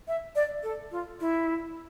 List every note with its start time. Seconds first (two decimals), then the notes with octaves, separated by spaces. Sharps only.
0.08 E5
0.36 D5
0.63 A4
0.92 F4
1.20 E4